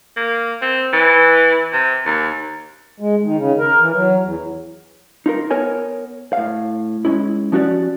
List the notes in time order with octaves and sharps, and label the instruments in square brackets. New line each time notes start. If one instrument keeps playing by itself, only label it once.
[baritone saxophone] A#3
C4
E3
C3
D#2
[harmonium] G#3
D#3
C#3
A#4
E3
F#3
E2
[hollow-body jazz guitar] D#4 F4 A#4
B3 A#4 C#5 G#5
A2 F5
G#3 C#4 E4
F3 C#4 F#4 G4 D5